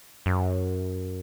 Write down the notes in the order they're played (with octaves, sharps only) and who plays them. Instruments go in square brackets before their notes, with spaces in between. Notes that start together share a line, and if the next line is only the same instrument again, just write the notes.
[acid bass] F#2